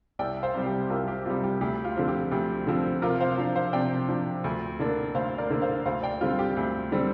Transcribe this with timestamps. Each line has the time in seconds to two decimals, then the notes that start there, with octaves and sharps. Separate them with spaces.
0.19 C2 D5 G5
0.43 C5 F5
0.54 C3 G3
0.66 G4
0.90 C2 F4 A#4
1.08 G4
1.25 C3 G3 F4
1.43 G4
1.61 D2 G4
1.84 F4
1.96 D3 F3 C4
2.08 G4
2.31 D2 G4
2.67 D3 F3 C4
3.02 C3 F4 A#4
3.20 C5 F5
3.38 F3 D4
3.56 C5 F5
3.73 C3 D5 G5
4.08 F3 D4
4.44 D2
4.79 D3 A#3 D4
5.14 D2 C5 F5
5.38 A#4 D5
5.50 D3 A#3 D4
5.62 C5 F5
5.86 D2 C5 F5
6.03 D5 G5
6.21 D3 G3 C4 F4
6.39 G4
6.57 D2
6.92 D3 G3 C4